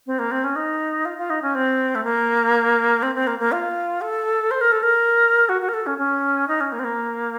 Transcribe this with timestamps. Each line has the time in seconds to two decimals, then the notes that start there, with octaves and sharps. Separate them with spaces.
0.07 C4
0.19 A#3
0.31 C4
0.44 C#4
0.56 D#4
1.05 F4
1.18 F4
1.30 D#4
1.42 C#4
1.55 C4
1.95 A3
2.04 A#3
3.03 C4
3.15 C4
3.27 A#3
3.39 A#3
3.52 F4
4.01 A4
4.51 C5
4.61 A#4
4.72 A4
4.83 A#4
5.49 F#4
5.62 F#4
5.69 A#4
5.74 A4
5.87 C#4
5.98 C#4
6.48 D#4
6.61 C#4
6.72 A#3
6.79 C4
6.84 A#3